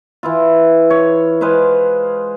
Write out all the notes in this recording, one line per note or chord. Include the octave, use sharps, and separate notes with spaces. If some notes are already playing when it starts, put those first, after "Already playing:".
E3 E4 F4
C#5
G#3 B4 C5 F5